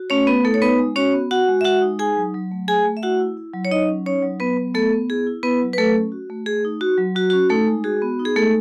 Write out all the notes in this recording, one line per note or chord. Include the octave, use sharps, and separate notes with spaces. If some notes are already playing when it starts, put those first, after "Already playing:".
Already playing: F#4
A3 C#4 C#5
A3 B3 B4
A3 D#4 A4
C#5
B3 D#4 B4
G#3
C#4 F#4 C#5
B3
F#4 F#5
G#3
E5
G#3 F#4 F#5
D#4
D#4 G#4 G#5
F#3
F#3
A3
A3 G#4 G#5
A3
E5
E4 F#4 F#5
E4
E4
F#3
C#5
F#3 D#4 D#5
C#4
C#4 D#4 C#5
F#3
F#3 B3 B4
B3
A3 B3 A4
B3
E4 G#4
E4
B3 E4 B4
F#3
B4
F#3 A3 A4
C#4
F#4
A3
A3 G#4
D#4
F#4
F#3
F#3 F#4
F#4
C#4
A3 D#4 A4
G#3
F#4 G#4
B3
D#4
G#4
G#3 A3 A4